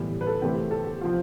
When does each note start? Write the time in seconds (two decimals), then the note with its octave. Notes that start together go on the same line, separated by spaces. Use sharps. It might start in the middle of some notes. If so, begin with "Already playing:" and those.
Already playing: A2 E3 G3 B3
0.21 B4
0.27 A4
0.42 C3 E3 A3 C4 G4
0.71 A4
0.86 G4
1.01 C3 F3 C4 F4